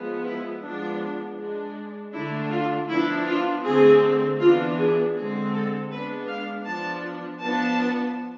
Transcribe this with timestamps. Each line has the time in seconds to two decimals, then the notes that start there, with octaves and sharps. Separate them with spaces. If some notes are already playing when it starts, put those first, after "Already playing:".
Already playing: F3 G#3 B3
0.26 E4
0.63 F3 G#3 B3 D4
1.38 G#3 D4
2.13 D3 A3 D4 E4
2.51 F4
2.89 F3 B3 D4 E4
3.27 F4
3.64 D3 A3 C4 G#4
4.39 E3 B3 D4 F4
4.77 G#4
5.15 D3 G#3 C4 G#4
5.53 A4
5.90 G#3 B3 D4 B4
6.28 F5
6.65 F3 B3 D4 A5
7.40 F3 B3 D4 A5